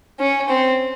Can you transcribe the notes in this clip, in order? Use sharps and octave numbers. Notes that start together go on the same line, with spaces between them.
C#4
C4